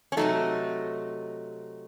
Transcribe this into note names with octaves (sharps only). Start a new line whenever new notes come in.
C#4
C3 F#3 A3 D#4